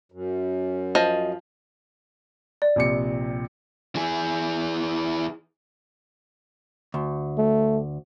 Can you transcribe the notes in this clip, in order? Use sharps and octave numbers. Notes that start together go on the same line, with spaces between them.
F#2
F3 D#5
D5
A#1 C3 C#7
E3 G#4
D2
A3